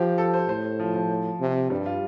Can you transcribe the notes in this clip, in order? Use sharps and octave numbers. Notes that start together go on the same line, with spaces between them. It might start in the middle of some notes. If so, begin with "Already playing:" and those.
Already playing: F3 G4
A4
C5
A2 C5
F3
F3
C3
G2 G3
F4